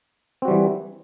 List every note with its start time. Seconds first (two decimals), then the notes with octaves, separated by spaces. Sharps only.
0.42 C4
0.45 F#4
0.48 G3
0.50 E3